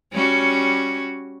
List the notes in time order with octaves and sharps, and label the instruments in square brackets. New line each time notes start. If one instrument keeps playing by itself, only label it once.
[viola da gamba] G3 C#4 F#4